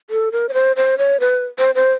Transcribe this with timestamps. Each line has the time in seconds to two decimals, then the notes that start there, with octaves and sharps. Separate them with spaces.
0.10 A4
0.32 A#4
0.49 C#5
0.54 C5
0.76 C5
0.98 C#5
1.20 B4
1.58 C5
1.75 C5